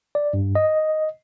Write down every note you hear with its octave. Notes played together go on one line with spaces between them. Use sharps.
D5
G2
D#5